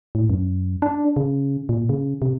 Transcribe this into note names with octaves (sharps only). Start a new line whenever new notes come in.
A2
F#2
D4
C#3
A#2
C#3
C3